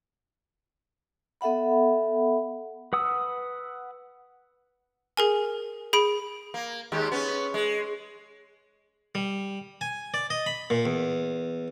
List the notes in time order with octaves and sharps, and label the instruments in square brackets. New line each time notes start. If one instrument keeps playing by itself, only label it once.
[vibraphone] B3 A4 E5 F#5 B5
[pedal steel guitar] B4 F#5 D#6 E6
[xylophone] G#4 A#4 G#5
G#4 B5 D7
[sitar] A#3
D#2 G#3 G4
B3 C#4
G#3
[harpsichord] G3
G#5
D5
D#5
B5
A#2
E2